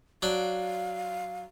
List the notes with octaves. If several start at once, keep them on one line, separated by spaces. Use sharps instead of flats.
F#3 D4 F5 G5